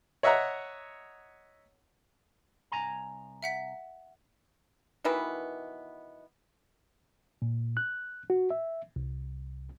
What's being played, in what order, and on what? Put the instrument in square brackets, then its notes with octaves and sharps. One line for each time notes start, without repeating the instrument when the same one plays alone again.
[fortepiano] C#5 D#5 E5 F#5 A#5
[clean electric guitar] C2 G#5 A#5
[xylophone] E5 F#5 B6
[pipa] B2 D#3 E3 B3
[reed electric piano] A#2
F#6
F#4
E5
C2